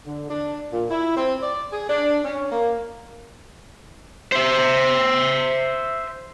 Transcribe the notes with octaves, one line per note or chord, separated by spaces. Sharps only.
D3
D4
A#2
E4
C4
D5
G#4
D4
C#4
A#3
C5 E5